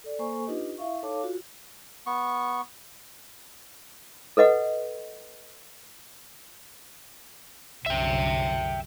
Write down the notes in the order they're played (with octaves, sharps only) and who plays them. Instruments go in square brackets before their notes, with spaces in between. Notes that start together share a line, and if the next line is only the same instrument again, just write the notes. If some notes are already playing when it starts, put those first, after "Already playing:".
[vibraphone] A4 D5
A#3 A4 C5 G#5 C#6
D4 D#4 F4 G4 B4 D#5
E4 E5 F5 C#6
D#4 A4 C#5 F5 A5 D6
F4 F#4
[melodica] B3 C#6
[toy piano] A4 B4 D#5 F#5
[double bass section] C2 F#2 D3 [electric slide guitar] E5 G5